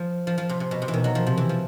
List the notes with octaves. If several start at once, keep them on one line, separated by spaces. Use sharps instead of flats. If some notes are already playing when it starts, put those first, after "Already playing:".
Already playing: F3
F3
F3
C3
C3
B2
C3
E3
B2 D#3
F#3
F3
C3 F3
E3
F3